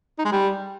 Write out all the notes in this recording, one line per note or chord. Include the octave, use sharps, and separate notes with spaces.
D#4
G#3
G3